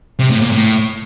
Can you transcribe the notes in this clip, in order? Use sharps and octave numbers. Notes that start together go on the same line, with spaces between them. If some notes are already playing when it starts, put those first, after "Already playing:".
C3
A2
A#2
A2